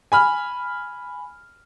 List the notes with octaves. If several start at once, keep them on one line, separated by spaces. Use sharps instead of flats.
G#5 B5 F6